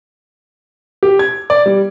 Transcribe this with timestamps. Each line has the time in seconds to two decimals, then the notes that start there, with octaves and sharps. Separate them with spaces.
1.03 G4
1.19 G#6
1.50 D5
1.66 G3